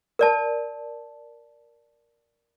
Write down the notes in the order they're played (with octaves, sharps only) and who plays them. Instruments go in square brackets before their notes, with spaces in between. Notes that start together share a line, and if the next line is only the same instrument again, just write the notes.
[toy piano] A#4 D5 A5